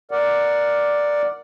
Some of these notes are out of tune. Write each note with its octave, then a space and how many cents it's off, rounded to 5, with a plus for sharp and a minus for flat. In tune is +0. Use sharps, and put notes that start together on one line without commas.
A#4 +0 D5 +0 F#5 +0